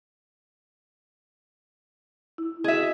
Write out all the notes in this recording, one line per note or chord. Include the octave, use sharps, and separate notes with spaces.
E4
F#4 G#4 D#5 E5